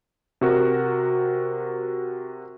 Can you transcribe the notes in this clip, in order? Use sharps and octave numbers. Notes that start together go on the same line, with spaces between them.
C3 F#4 A#4